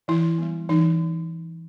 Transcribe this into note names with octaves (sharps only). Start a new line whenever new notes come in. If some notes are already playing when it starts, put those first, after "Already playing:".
E3 E4
G3 B3
E3 D#4